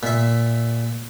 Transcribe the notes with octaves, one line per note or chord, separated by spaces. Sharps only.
A#2 E5